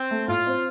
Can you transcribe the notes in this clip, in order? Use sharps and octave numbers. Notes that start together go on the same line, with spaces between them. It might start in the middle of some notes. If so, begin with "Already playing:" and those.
Already playing: C4
A3
A2 F4
C4